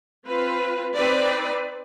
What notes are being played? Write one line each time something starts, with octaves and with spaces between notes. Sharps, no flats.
C4 F4 B4
C4 D#4 B4 D5